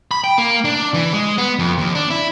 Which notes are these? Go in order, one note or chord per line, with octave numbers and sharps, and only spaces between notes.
B5
G5
A#3
D4
E3
G#3
B3
F2
D#2
D4
E4